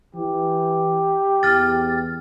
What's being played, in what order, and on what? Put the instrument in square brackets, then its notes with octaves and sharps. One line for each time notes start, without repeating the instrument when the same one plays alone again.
[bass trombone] E3 [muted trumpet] G4
[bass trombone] E2 [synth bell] F6 A6